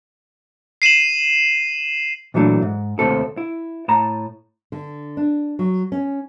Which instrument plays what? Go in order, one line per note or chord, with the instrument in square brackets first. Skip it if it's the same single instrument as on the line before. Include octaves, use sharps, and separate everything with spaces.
[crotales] C7 D#7 E7 F#7
[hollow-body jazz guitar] A#2 E3 F#3 A3 D4
G#2
D#2 C3 A3 C4 A4
E4
A2 A5 A#5
[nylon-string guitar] D3
D4
F#3
C#4